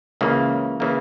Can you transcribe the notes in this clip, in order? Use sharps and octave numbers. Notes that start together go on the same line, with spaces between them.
C#2 C#3 E3 A#3
C#3 E3 A#3